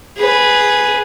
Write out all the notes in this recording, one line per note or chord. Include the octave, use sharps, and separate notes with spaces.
G#4 B4